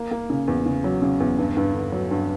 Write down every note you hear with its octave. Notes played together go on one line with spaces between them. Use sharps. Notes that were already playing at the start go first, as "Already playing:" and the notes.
Already playing: A#3
A#3
C#3
E2
C#3
F#3
C#3
E2
G2
G2
D3
F#3
G2